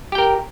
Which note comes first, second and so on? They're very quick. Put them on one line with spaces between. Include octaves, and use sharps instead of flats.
G4 G5 A#4